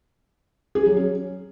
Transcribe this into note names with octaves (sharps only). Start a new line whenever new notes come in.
G#4
F#3
C#4